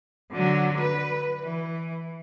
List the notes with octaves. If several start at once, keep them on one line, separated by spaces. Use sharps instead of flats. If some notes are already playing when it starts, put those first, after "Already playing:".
D3 F#3
B4
E3